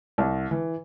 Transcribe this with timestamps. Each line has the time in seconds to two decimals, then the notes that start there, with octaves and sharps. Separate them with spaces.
0.18 C2
0.51 E3